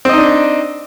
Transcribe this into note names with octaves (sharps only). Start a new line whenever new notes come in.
C4 D4 D#4 D#5